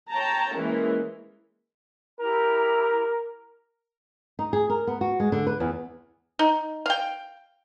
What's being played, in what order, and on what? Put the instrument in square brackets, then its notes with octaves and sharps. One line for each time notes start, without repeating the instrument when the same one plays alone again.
[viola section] C#5 G5 A5 A#5
E3 G#3 A#3 C#4
[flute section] E4 G4 A#5 [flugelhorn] A#4
[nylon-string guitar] D#4
G#4
A#4
B3
F#4
G#3
D3
B4
E2
[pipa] D#4
F5 G5